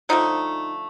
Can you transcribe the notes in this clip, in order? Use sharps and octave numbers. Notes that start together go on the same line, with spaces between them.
D3 F3 A3 D#4